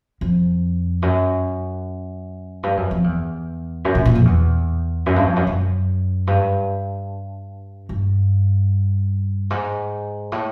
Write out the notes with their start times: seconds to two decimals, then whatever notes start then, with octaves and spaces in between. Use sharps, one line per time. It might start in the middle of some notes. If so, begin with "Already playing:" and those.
0.21 F2
1.02 F#2
2.63 G2
2.77 F#2
2.91 F2
3.04 E2
3.85 F#2
3.95 A#2
4.05 A#2
4.15 F2
4.25 E2
5.06 F#2
5.16 G2
5.26 F2
5.36 F#2
5.47 F#2
6.27 G2
7.89 G2
9.50 G#2
10.32 A2